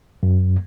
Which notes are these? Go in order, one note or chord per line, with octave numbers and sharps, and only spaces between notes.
F#2